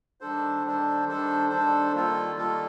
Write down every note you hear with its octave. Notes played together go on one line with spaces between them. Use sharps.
D#3 G3 D4 A4 C5
D#3 G3 D4 A4 C5
D#3 G3 D4 A4 C5
D#3 G3 D4 A4 C5
D#3 G3 A#3 F4 A4
D#3 G3 A#3 F4 A4